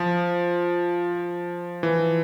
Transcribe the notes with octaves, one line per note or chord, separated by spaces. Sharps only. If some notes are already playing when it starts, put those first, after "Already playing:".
Already playing: F3
E3